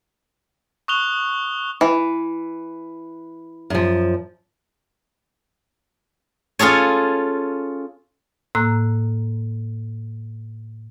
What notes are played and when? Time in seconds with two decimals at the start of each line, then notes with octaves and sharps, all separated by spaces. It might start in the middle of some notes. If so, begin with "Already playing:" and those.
0.88 C#6 D#6 F#6 F7 G7
1.81 E3
3.70 F#2 F3
6.59 C#4 F4 G#4 A4 C#5
8.55 A2 A#3 A#5 E6 F#6